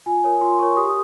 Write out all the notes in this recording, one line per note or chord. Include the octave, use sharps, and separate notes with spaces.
F4 G#5
A#4 C#5
F4 C6
A#4 C#5 C#6
G4 D#6